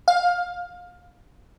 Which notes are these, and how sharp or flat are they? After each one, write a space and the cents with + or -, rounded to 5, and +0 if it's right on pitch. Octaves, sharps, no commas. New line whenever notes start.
F5 +20